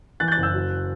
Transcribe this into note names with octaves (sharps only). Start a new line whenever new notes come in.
E3 F#6 A6
G6
F#6 A6
F#1
E6 G6
F#3